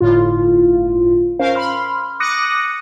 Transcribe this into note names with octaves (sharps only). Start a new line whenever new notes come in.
G1 A2 F4
C#4 A#4 C5 F5
B5 C6 F6
D6 D#6 F#6 A#6 C#7 D#7